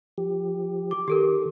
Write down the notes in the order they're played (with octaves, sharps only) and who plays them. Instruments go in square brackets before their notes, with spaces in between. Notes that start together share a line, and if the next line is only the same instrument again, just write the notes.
[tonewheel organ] F3 G4
[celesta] D6
[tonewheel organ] D#3 [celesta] G4 A4 A#4